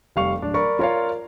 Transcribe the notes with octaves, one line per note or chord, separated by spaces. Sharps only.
F1 G3 F5 C#6 F7
D1 D4
A#4 D5 B5 C#6
F4 A#4 C#5 D5 F5